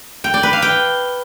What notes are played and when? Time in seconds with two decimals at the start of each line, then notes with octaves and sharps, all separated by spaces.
0.24 G5
0.34 D5
0.43 B4
0.53 F5
0.62 G5